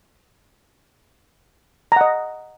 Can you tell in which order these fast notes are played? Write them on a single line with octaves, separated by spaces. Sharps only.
A#5 F#5 D#5